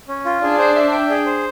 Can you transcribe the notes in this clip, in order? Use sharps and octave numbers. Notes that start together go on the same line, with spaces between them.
C#4
F4
D4 G#4
C5
E5
G5
G#4
C5